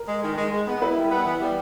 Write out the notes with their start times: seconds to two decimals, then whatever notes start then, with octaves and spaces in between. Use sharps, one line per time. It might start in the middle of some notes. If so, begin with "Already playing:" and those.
Already playing: A#4
0.08 G#3
0.23 D#3
0.37 G#3
0.52 G#3
0.67 B3
0.82 E4 B4
0.97 G3
1.11 B3
1.26 E3
1.41 G3